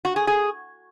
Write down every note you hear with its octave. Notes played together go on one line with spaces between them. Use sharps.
F#4
G#4
G#4